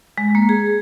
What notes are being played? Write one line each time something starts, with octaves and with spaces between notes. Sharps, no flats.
G#3
A#3
G#4